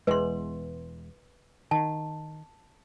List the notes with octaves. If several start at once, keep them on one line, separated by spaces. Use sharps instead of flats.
E1 E2 G#3 B4 C6
D#3 A5